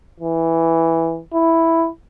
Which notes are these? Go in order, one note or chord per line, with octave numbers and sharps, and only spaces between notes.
E3
E4